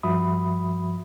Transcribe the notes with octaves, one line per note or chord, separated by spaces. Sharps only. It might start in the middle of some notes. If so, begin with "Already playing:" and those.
G2 F3 F#4 E5 B5 D#6